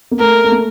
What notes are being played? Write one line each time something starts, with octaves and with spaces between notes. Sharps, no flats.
A#3
A3 A#4
A3
A#3